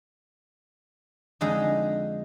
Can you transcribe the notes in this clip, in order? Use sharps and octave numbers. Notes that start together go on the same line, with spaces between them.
F2 D3 G#3 D#4 A#5